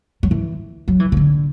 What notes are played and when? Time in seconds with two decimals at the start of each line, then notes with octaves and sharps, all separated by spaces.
0.23 F#3
0.31 E3
0.88 F#3
1.00 E3
1.12 C#3
1.17 D3